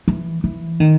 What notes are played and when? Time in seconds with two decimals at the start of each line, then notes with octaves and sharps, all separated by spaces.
0.08 E3
0.44 E3
0.80 D#3